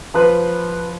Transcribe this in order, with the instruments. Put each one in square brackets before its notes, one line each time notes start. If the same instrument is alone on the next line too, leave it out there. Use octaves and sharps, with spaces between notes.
[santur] F3 B4